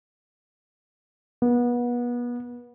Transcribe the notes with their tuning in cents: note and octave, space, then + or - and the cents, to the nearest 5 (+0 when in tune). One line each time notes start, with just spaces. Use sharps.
B3 -30